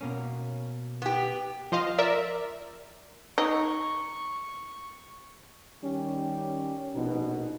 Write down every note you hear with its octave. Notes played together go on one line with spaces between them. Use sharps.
B2 A#3 C#4
B3 G4
F3 C5 D#5 F5
A#4 D5 E5
D#4 C#6
D#3 G3 C#4 G4
A#1 B2 D#4